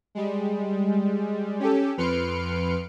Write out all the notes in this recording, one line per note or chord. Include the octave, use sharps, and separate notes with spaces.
G3 G#3
C#4 G4 A4
F2 B4 C6 F6 C#7 D7